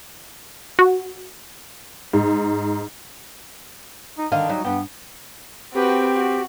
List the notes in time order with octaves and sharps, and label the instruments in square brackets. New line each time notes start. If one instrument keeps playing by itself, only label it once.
[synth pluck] F#4
[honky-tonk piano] G#2
[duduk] D#4
[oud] D3 D#5 F5 [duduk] D#3
[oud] F#3 G3 [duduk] D#4
[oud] G2 G4 [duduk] B3
[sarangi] C4 [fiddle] F#4 B4 [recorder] G4
[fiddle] F#4